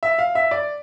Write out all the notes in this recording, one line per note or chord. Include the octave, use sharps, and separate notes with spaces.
E5
F5
E5
D5